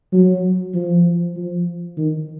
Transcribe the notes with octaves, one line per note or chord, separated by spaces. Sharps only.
F#3
F3
F3
D#3